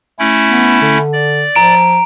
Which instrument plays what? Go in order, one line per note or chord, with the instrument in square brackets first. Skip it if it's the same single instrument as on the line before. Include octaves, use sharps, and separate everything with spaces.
[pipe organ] A3 C#4 E4
[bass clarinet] B3
D3
[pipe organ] D5
[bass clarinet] F3 [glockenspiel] A#5 D7